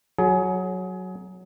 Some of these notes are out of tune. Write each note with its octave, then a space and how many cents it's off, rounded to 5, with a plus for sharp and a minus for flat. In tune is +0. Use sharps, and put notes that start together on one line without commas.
F#3 +0 G#4 +25